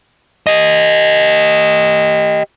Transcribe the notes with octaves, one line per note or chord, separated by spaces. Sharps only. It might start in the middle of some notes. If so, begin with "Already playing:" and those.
G4 D#5